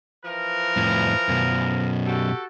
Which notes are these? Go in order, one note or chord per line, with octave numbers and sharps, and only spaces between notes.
E3 F3 A#4
F2 A2
F#2 B2
F#4 G4 A4